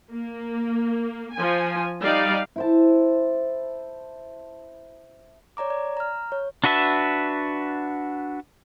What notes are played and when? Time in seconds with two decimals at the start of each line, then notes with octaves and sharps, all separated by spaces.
0.11 A#3
1.34 F3 G#5
2.02 G3 D#4 D5 F5
2.56 E4 C5 A5
5.57 C#5 D5 A#5 D6
5.70 D5
5.97 A#5 F6
6.32 C#5
6.64 D4 F#4 B4 E5 A5